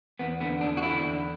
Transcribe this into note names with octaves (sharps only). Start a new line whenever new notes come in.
E2 B3
D3 B3
E2 D4
F#4
D3 E4
E2